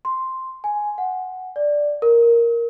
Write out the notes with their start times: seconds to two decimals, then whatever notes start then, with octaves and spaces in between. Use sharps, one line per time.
0.05 C6
0.64 G#5
0.98 F#5
1.56 D5
2.02 A#4